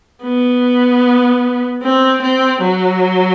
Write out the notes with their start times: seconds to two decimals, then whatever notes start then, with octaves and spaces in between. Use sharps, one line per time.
0.23 B3
1.83 C4
2.22 C4
2.61 F#3